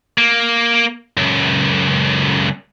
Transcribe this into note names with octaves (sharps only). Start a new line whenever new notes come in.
A#3
C#2 F#2